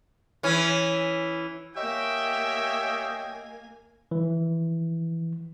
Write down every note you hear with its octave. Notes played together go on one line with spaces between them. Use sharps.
E3 C#4
A#3 C#4 G4 C#5 D#5 E5 G5 G#5
E3